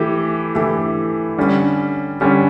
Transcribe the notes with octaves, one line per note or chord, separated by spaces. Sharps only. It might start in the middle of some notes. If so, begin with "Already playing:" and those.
Already playing: E3 A3 E4 G4
E3 A3 E4 G4
D3 G3 C#4
D3 G3 C#4